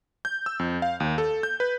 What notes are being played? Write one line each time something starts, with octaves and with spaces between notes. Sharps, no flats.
G6
E6
F2
F5
D#2
A4
G6
B4